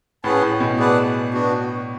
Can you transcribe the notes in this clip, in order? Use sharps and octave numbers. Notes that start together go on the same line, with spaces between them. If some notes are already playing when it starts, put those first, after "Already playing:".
A2 C#4 G#4 B4 F#5 A5
A2
B2
G#4 B4 D5 F#5 A5
B3 D4 F#4